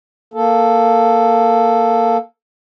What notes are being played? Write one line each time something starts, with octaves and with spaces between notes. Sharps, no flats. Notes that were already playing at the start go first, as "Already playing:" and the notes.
A#3 A4